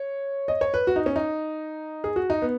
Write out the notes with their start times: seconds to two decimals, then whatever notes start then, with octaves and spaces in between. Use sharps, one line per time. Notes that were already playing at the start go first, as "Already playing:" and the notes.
Already playing: C#5
0.48 D#5
0.61 C#5
0.74 B4
0.87 F#4
0.96 D#4
1.06 C#4
1.16 D#4
2.04 G#4
2.16 F#4
2.30 D#4
2.42 B3